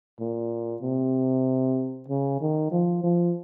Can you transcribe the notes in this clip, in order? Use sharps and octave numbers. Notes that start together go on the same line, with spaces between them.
A#2
C3
C#3
D#3
F3
F3